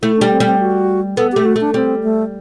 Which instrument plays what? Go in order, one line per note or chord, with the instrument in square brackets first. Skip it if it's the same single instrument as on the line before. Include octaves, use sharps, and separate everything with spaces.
[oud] A3 [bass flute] E4
[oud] G3 [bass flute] D4
[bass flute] C4
[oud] G3
[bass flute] C4
F#4
[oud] B3 [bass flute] A4
[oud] A3 [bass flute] G4
[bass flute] F#4
[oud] A3 [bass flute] D4
[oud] G3 [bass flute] C4
[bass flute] A3